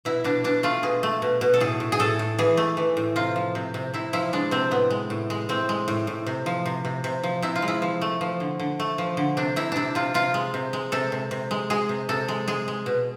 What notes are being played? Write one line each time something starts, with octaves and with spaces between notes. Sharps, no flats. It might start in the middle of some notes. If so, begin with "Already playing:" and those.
B2 E4
B2 D4
B2 D4
A3 F4
B2 G#4
A3
B2
B2
A4
A2 G#4
A2
G#4
A2 A4
A2
E3 G#4
A3
E3
A2
C3 F4
F3
C3
C3
C3 E4
F3 E4
G#3 D4
C3 C4
A2 B3
G#3
A2
G#3
A2 C4
G#3
A2
A2
C3
F3
C3
C3
C3
F3
C3 E4
F4
G#3
E4
F3
A3
F3
D3
D3
A3
F3
D3
C3 D4
C3 E4
C3 D4 E4
C3 F4
C3 F4
G#3
C3
G#3
C3 A4
C3
C3
G#3
G#3 G#4
C3
C3 A4
G#3
G#3 G#4
G#3
B2